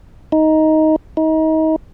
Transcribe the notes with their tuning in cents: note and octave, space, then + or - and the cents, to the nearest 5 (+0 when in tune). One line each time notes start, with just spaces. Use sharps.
D#4 +10
D#4 +30